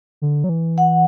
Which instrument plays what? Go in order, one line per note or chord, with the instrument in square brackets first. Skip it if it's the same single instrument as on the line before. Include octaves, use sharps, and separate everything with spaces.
[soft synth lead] D3
F#3
E3
[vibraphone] F#5